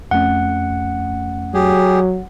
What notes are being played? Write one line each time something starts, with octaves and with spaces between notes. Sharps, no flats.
F2 A3 C#4 F#5
F#3 G4 G#4